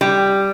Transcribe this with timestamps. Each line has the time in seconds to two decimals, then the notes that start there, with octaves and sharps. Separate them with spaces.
0.01 G3